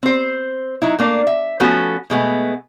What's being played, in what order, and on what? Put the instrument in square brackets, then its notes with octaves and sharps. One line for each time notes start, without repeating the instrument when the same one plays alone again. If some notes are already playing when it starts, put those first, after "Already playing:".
[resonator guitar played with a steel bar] C4 C5
F#3 D#4 E4
A3 A#3 D4
E5
F3 A3 B3 C#4 F#4 A4
B2 G#3 A3 B3